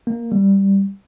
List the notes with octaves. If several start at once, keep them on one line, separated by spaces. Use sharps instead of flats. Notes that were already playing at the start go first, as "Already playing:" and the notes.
A#3
G3